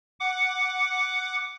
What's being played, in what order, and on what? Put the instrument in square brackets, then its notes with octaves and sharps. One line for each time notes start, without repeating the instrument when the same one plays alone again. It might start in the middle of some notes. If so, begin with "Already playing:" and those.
[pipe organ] F#5 D6